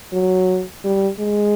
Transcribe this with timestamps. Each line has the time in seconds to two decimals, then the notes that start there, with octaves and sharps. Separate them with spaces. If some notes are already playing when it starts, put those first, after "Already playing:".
0.13 F#3
0.84 G3
1.20 G#3